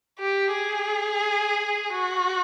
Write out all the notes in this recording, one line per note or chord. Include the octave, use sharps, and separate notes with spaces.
G4
G#4
F#4